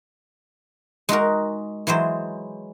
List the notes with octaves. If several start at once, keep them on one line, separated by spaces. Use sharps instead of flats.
G#3 D#4 F#4 A#4
E3 F#3 G#3 C5